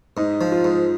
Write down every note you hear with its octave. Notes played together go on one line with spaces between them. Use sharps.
G#2 D#4
F3
F4
G#2